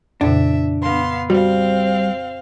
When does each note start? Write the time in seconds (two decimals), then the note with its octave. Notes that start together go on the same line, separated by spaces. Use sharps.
0.21 F2 A#2 C#3 D4 E5
0.81 B3 F5 C6
1.30 G3 C4 F#4 F5